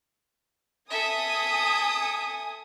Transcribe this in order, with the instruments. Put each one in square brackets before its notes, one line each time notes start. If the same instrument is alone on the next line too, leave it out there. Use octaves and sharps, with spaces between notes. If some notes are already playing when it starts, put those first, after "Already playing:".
[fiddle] A4 E5 [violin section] G#5 D#6